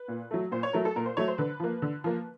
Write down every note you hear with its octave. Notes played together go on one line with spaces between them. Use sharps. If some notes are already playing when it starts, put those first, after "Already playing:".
Already playing: B4
A#2
F#3 A3
A#2 C5
C#5
F#3 A3 A#4
A4
A#2 A#4
C5
F#3 A3 C#5
C5
D3 B4
F3 A#3
D3
F3 A#3